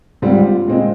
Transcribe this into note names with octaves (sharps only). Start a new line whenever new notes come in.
G#2 G3 C4 F4
A#2 G#3 C4